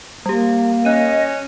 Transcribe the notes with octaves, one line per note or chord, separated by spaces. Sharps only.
G3 A#3 G4
C#4 D#5 F#6 D#7